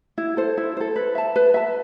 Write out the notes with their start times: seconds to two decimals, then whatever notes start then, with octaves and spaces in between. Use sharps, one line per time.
0.18 E4
0.37 A4 C5
0.57 E4
0.77 A4 C5
0.96 B4
1.15 E5 A5
1.36 B4
1.54 E5 A5